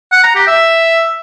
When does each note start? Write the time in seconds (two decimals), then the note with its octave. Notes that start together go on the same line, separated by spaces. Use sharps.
0.12 F#5
0.24 A#5
0.35 G4
0.47 E5